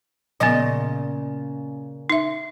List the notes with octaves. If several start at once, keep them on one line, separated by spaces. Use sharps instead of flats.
A#2 C#3 F3 B3 D#5
D#4 E5